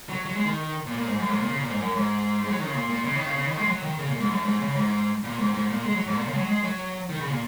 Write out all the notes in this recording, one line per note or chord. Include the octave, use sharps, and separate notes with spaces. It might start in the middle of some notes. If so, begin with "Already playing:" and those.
F#3
F#3
G#3
D#3
A#2
A#2
G#2
F#2
G#2
A#2
C#3
A#2
G#2
F#2
G#2
G#3
F#3
D#3
C#3
A#2
A#2
C#3
D#3
C#3
C#3
D#3
G#3
F#3
D#3
C#3
A#2
G#2
F#2
G#2
C#3
G#2
A#2
G#2
G#2
A#2
G#3
F#3
G#2
A#2
C#3
G#3
F#3
G#3
F#3
D#3
C#3
A#2